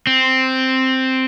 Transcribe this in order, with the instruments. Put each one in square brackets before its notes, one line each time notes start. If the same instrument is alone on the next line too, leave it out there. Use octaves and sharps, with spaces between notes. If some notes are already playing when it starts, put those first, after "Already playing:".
[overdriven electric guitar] C4